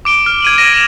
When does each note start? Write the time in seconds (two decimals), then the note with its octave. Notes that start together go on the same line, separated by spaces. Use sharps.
0.05 D6 D7 G7
0.26 F6
0.42 G#6 D#7 F#7
0.58 A#6 D#7 E7
0.73 D7 E7 F7